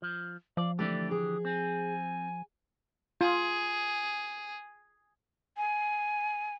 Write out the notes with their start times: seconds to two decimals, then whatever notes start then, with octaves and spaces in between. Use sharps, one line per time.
0.02 F3
0.57 F3 D5 F5
0.79 D3 E3 A3 D4 G4 D5 A6
1.11 G#4 D#6
1.45 C4 G#5
3.21 F4 G#4
5.57 G#5